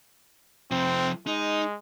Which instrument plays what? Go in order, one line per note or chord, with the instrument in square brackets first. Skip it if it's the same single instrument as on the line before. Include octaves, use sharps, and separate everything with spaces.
[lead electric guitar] C3 F3 [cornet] C4
[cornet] G#3 [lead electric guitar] D#4